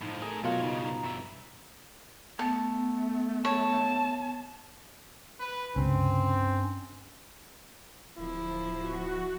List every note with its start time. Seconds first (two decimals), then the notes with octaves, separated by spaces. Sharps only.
0.02 A2 F3 D#4
0.22 A3 G#4 A#4 G#5
0.44 B2 F#3 F4 A#4 C#5
0.61 G2 C#3 D#4
0.85 A#5
1.04 G2 E5
2.39 A3 B3 A5
3.45 C#5 A5
5.40 B4
5.76 C#2 G2 C3 C4 C#4
8.18 D1 F3 E4
8.79 F#4